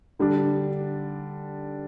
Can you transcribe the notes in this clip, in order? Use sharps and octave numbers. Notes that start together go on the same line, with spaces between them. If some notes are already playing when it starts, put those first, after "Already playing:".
D3 G3 D4